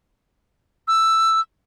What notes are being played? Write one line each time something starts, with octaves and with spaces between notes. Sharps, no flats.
E6